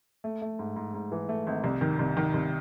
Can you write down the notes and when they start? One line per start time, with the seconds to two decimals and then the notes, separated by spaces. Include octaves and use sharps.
0.24 A3
0.42 A3
0.59 G#2
0.76 G#2
0.94 G#2
1.12 E3
1.29 A3
1.47 G#1
1.64 C2
1.81 D#3
1.99 C2
2.17 D#3
2.34 C2